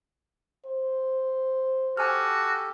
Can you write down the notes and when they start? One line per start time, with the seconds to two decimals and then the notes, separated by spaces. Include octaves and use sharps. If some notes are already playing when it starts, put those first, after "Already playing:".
0.66 C5
1.97 F#4 G4 A4 G#5 F6